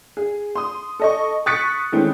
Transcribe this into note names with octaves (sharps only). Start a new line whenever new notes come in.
G#4
C6 D#6
A4 D#5 C#6
C#6 D#6 F#6 A6 B6 C#7
D#3 E3 G#3 A3 C4 C#4